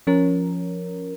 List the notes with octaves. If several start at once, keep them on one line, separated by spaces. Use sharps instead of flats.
F3 C#4 A#4